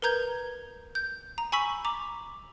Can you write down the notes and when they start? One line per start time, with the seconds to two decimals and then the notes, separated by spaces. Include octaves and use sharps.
0.02 A#4 B4 A#5 G6 G#6
0.95 G6
1.38 A#5
1.52 G#5 B5 C#6 E6 B6 F#7
1.85 A#5 D6